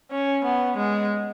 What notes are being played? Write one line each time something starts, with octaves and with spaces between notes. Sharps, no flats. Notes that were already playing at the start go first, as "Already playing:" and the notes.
C#4
B3
G#3